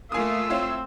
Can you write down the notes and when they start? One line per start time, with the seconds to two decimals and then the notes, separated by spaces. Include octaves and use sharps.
0.12 A3 A#3 F4 G#5 D#6 E6
0.50 C4 E4 C#5 F5